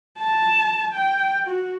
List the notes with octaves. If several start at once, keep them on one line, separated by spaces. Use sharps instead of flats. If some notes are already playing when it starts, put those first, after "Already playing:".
A5
G5
F#4